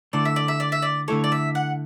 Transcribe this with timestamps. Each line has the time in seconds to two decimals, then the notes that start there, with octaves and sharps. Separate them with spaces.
0.13 D3 A3 E4 A4 D5
0.25 E5
0.36 D5
0.48 E5
0.60 D5
0.72 E5
0.82 D5
1.08 D3 A3 E4 A4 C#5
1.24 D5
1.32 E5
1.55 F#5